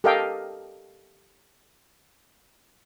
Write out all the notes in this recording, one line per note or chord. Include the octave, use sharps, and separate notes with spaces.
G4 A4 A#4 D#5 F5 G5